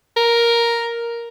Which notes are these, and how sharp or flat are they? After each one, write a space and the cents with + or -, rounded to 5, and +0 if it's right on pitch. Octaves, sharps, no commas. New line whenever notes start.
A#4 +5